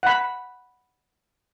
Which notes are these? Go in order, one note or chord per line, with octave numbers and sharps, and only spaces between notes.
F#5 B5